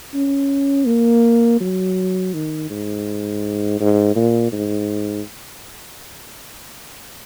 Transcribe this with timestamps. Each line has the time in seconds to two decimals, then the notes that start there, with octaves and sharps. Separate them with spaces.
0.14 C#4
0.86 A#3
1.60 F#3
2.34 D#3
2.70 G#2
3.80 G#2
4.16 A#2
4.52 G#2